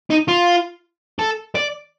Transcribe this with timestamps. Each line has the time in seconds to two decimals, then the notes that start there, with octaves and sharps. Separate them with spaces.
0.10 D#4
0.28 F4
1.19 A4
1.55 D5